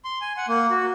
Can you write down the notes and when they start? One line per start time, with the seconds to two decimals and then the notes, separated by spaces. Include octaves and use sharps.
0.05 C6
0.21 G#5
0.37 F#5
0.48 A#3
0.70 F#4